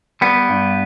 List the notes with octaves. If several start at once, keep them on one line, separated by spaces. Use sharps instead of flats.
G3 B3
G2